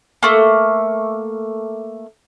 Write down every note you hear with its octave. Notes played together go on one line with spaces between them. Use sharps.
A3 A#3